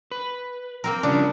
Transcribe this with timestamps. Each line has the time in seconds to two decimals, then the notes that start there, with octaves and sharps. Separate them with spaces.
0.11 B4
0.84 A#3 C4 A#4
1.03 C#3 F3 G3 D4